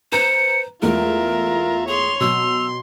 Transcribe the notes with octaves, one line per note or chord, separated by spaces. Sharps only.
B4 C5 A#5 C#7
E2 G#3 A3 F4 A#4 E5 A#5
G#4 C#5 C6 F7
B2 F#3 C6 E6